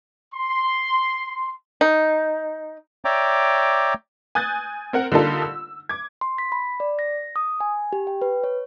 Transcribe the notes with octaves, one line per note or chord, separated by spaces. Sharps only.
C6
D#4
C#5 D5 E5 G5 A#5 D6
G#5 D#6 F#6 G6 A6
C4 A#4 F#5
D3 G3 A#3 D#4 F4 A4
E6
D6 G#6
C6
B6
B5
D5
A#6
D#6
G#5
G4
G5
B4
C#5